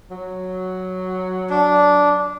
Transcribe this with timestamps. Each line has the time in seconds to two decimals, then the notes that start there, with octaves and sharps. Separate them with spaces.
0.11 F#3
1.50 D4